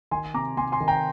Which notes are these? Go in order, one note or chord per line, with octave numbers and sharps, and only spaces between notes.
D#3 G#5 C6
C3 A#5 D6
C3 G#5 C6
G#5 C6
D#3
G5 A#5